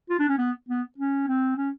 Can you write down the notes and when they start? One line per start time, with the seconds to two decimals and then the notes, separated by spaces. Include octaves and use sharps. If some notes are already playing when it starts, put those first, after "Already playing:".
0.09 F4
0.19 D4
0.28 C#4
0.38 B3
0.69 B3
0.98 C#4
1.27 C4
1.56 C#4